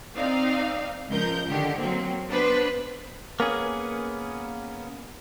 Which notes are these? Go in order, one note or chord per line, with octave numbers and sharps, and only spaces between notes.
C4 D#4 D5 F5
C#2 F3 A#4 G6
D3 D#3 G4
F#3 A#3 C4
B3 D4 B4 C5
A#3 B3 C#4 G#4